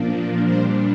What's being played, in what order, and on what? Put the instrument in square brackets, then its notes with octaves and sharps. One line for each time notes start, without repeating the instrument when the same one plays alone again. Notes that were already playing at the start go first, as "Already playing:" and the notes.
Already playing: [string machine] A#2 F3 A#3 D4
A#2 G3 D4 C5